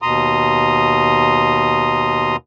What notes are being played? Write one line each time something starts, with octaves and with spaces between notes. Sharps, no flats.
D#2 B2 A#5 C6 D#6